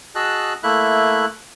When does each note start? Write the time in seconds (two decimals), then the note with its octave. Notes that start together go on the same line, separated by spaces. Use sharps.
0.15 F#4 G#4 D#5 A5 E6 F#6
0.63 A3 A#3 E4 E5 F#6